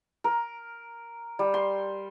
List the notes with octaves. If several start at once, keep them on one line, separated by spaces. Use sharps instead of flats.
A#4
G3
C6